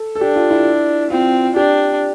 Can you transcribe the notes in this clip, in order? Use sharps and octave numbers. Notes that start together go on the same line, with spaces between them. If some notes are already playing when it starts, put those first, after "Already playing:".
Already playing: A4
A4
D4 G4
F4
E4
C4 F4
D4 G4